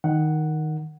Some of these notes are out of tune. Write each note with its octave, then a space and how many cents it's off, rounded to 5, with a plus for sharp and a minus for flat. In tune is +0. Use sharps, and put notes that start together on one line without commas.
D#3 +0 F#5 +0